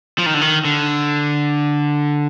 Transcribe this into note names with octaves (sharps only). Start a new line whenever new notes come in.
F3
D#3
D3
D#3
D3